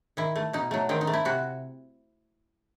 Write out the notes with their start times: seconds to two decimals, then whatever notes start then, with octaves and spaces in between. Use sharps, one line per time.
0.17 D#3 E4
0.36 A3
0.53 B2 D#4
0.71 F#3 A3
0.89 D#3 C4
1.01 D#4
1.07 A3
1.13 E4
1.25 C3 F#4